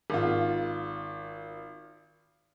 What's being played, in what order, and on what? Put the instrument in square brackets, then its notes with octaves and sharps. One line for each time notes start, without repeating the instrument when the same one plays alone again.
[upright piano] G#1 F4